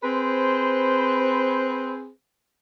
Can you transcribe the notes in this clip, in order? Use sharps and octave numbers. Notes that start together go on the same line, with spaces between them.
C4 G#4 B4 C5